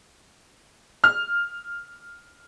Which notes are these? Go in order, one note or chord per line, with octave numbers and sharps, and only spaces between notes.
F6